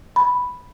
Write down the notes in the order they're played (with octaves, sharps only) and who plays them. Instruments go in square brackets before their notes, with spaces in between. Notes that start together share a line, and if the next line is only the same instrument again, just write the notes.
[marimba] B5